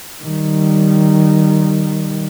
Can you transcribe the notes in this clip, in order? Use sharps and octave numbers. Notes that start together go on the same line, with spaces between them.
D#3 G3